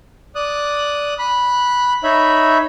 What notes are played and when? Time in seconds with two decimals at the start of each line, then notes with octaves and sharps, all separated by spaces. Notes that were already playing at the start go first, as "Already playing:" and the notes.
0.35 D5 D#6 F#6
1.19 B5 F#6
2.04 D#4 C#5 E5 B5